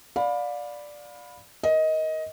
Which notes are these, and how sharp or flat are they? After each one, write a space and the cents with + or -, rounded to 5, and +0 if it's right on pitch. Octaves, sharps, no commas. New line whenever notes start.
D5 +0 F5 +30 B5 +0
A#4 +20 D#5 +15